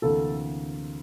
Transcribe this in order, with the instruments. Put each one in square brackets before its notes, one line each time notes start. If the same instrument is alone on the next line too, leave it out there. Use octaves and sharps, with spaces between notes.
[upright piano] D2 C3 E3 A#3 [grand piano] A4